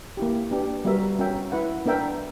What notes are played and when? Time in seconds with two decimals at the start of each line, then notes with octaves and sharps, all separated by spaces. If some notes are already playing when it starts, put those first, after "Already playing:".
0.17 A#3 E4 G4
0.51 B3 D4 G4
0.85 G3 B3 F#4 A#4 E5
1.19 C#4 F#4 A#4 E5 G5
1.52 E4 B4 F#5
1.86 B3 D4 A#4 E5 G5